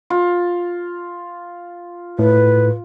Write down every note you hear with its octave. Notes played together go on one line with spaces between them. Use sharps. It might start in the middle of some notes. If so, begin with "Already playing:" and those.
F4
A2 B4